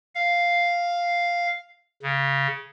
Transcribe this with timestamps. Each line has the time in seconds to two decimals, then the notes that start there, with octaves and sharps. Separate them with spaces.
0.15 F5
2.02 C#3